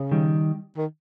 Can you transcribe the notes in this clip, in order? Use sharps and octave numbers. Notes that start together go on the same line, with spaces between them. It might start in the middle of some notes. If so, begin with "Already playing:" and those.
Already playing: C#3
D#3 G3
D#3